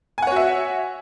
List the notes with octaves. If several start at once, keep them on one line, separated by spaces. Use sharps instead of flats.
F#4 C#5 E5 F#5 G#5